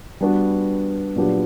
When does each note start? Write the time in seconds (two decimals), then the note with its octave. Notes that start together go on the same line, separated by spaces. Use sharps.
0.21 G3 B3 D4 F#4 B4
1.16 A#2 F#3 B3 D4 G4